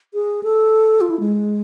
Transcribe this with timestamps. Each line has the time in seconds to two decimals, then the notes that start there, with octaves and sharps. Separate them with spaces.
0.14 G#4
0.43 A4
1.01 F4
1.10 E4
1.20 G#3